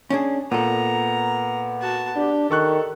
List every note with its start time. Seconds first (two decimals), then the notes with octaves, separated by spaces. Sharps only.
0.10 C#4 D4 G#4
0.51 A#2 B3 A4 A#5
1.82 F#4 A5
2.16 D4 G4
2.51 D#3 A4 C#6 F#6